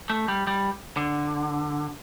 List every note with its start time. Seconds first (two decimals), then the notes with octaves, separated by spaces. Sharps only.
0.10 A3
0.28 G3
0.47 G3
0.97 D3